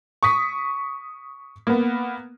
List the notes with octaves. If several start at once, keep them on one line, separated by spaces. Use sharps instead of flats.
C#6 D#6 B6
A#3 B3